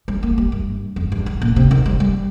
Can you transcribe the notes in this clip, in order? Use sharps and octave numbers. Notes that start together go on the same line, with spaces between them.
G3
A#3
G3
G2
F2
G2
G2
A#2
C3
D#3
G3
G3